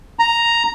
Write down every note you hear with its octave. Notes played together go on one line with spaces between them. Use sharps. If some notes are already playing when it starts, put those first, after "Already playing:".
A#5